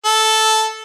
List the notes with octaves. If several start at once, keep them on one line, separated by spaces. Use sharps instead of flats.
A4